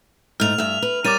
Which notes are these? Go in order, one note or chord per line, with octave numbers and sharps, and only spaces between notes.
G#2 A3 F6 F7
G2 E5
B4
G3 A#4 C#5 D6 A6 D#7